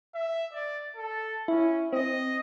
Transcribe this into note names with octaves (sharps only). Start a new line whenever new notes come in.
E5
D5
A4
C#4 E4
C4 D#5